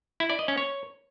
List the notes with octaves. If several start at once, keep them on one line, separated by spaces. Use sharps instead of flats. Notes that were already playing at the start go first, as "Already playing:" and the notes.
E4
D5
D#5
C#4
C#5